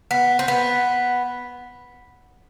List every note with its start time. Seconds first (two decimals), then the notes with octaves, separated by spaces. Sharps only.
0.11 B3
0.39 C4
0.48 B3